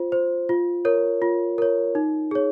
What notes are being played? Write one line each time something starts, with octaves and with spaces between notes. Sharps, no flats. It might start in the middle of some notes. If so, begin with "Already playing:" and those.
Already playing: F4 C5
C5
F4
A#4 C#5
F4
A#4 C#5
D#4
G#4 C#5